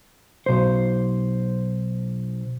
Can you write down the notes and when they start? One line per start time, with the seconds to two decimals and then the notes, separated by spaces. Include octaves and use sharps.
0.46 B1 C5